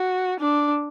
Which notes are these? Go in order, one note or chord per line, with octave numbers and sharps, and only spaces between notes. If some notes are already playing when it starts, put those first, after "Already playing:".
Already playing: F#4
D4